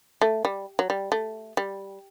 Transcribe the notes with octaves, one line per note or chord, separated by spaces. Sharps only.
A3
G3
F#3
G3
A3
G3